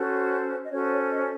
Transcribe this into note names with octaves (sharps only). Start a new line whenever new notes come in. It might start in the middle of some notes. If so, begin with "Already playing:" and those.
Already playing: C#4 F#4 A4 C5
D#5
C#4 F#4 A4 C5 C#5
C#5
D#5